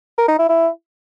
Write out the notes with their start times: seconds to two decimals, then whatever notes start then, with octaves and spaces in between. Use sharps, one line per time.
0.18 A#4
0.28 D#4
0.39 E4
0.49 E4